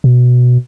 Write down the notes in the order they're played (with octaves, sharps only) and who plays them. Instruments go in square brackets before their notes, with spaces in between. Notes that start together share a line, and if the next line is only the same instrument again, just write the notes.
[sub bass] B2